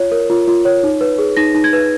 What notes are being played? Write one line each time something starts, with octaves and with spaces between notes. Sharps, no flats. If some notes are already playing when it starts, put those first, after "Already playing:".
Already playing: F4 C#5
A#4
F4
F4
C#5
D#4
B4
G#4
D#4 A#6
D#4
G#6
B4